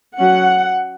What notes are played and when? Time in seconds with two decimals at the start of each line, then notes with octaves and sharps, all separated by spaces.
0.19 F#3 C#4 F#5